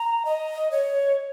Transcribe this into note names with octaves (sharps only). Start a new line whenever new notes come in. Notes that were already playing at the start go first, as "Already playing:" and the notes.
Already playing: A#5
D#5
C#5